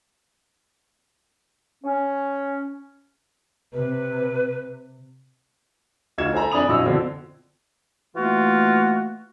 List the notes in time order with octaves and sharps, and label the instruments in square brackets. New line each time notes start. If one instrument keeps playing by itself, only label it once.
[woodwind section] C#4
[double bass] C3 [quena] B4
[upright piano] D2 D#4 F4 G#6 E7
A4 C5 G#5 A#5 B5
F2 D4 G#5 B5 D#6 F7
A#1 F#2 E4 D#5 E6
B2 D3 E3 F3 C4 D4
[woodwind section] E3 A3 A#3 F4 F#4